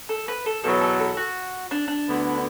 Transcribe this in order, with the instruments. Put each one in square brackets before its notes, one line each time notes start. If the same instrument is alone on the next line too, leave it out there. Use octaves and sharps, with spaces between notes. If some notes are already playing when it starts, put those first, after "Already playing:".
[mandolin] A4
B4
A4
[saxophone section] E2 B2 F#3 B3 [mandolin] A4
[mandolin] A4
A4
F#4
D4
D4
[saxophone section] D2 D3 B3 E4